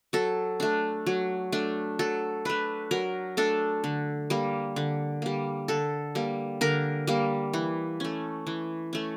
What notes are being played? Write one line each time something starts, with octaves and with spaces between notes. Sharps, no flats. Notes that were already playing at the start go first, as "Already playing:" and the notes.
F#3 A4
A3 D4
F#3
A3 D4
F#3 A4
A3 D4 B4
F#3 A#4
A3 D4 A4
D3
G3 A#3
D3
G3 A#3
D3 A4
G3 A#3
D3 A#4
G3 A#3
E3
A3 C#4
E3
A3 C#4